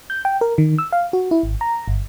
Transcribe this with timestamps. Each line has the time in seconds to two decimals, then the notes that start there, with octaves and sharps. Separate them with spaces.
0.10 G6
0.25 G5
0.41 A#4
0.58 D#3
0.78 E6
0.93 F5
1.13 F#4
1.31 E4
1.43 G#1
1.61 A#5
1.88 G1